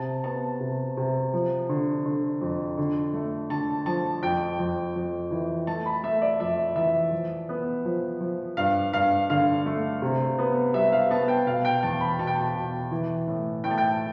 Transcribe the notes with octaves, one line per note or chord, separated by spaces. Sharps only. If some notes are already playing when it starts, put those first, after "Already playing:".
Already playing: C3 A5
B3 A5
C3
C3
F3
D3
D3
F2
D3
A3
D3 A5
F3 A5
F2 G5
F2
F2
E3
A3 A5
B5
A3 E5
D5
F2 E5
E3 E5
F3
B3
F3
F3
G2 F5
G2 F5
D3 F5
A3
C3
B3
G3 E5
F5
B3 A5
G5
B2 F5
G5
E2 A5
B5
B2 A5
G5
A5
B2
E3
A2
A2 G5
A5
G5